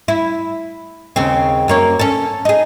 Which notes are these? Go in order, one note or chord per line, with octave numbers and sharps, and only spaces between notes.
E4
D#2 C#3 C4
F#2 A#3 C#5
C#4 A4
D#4 G#4